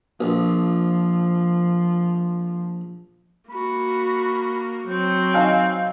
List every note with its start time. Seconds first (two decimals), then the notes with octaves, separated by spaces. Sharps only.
0.21 A#1 F3
3.50 A#3 F#4 B5
4.88 F#3 C4
5.34 D#4 F5 G#5